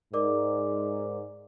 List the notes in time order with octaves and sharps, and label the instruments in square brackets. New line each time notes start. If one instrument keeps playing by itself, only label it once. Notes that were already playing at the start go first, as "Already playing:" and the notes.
[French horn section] G#2 [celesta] A#4 D5 D6